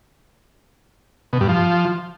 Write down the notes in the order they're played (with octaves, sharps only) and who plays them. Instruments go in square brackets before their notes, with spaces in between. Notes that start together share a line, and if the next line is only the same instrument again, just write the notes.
[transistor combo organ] B2
G2
F3